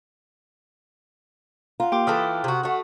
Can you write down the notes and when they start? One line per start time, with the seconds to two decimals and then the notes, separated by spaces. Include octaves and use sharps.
1.80 F4 F#5 A#5
1.92 A#3 G4 G5 C6 D6
2.07 E3 E4 A4 D#6 F6 F#6
2.44 C3 F#4
2.63 A3 F#4